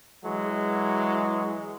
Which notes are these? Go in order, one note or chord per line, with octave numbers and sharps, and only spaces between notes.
E3 F#3 G#3